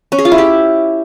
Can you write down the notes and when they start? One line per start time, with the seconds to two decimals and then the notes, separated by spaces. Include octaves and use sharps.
0.12 C#4
0.18 G#4
0.25 F4
0.32 E4
0.38 G4